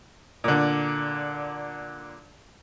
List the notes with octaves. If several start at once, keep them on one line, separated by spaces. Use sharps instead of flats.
A#2 D3